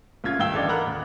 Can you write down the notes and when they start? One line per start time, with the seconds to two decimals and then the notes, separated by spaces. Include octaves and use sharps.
0.24 C2 C#4 F4 G#6
0.39 G2 D#3 F5 G5 E6 G7
0.54 A1 D3 D5 D#5 D6
0.68 A4 A#4 F#5 A#5 B5 F#6
0.86 D#1